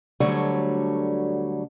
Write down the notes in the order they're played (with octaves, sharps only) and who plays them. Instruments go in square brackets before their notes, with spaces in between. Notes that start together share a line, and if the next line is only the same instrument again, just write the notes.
[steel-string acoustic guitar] D2 D3 F#3 G3 A3 C#5